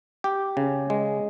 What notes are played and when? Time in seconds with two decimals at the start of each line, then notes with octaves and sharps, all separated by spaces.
0.24 G4
0.57 C#3
0.90 G#3